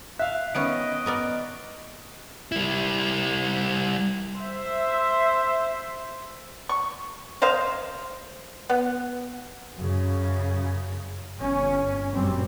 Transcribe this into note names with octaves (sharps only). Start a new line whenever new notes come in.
E5 F5 F#6
D#3 B3 C#4 D#5 C#6 F#6 D7
B3 A#4 D5
G3 E4
C5 E5
C#6
A#4 C5 D#5 F5
B3
F#2 C#3
G1 C#4
F#1 F#2 A#2 G3 C4